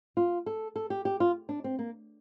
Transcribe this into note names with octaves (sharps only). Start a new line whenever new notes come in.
F4
A4
A4
G4
G4
F4
D4
C4
A#3